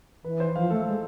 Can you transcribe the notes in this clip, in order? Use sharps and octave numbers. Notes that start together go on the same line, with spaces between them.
E3 B4
C5
F3 F5
A3 A4
G#3